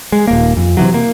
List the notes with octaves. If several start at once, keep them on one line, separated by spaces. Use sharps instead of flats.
G#3
D#1 A#3
F2
C3 E3 F#3
A#3